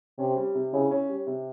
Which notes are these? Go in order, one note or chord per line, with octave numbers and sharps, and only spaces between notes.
C3 C#4
G3
C3
C#3 E4
C#4
G3
C3